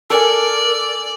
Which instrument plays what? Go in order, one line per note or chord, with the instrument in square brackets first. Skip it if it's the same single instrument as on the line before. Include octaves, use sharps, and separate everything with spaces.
[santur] A4 G#5 [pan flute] A#4 [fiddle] D5